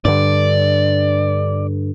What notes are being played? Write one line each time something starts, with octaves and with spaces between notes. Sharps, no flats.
G2 D3 D5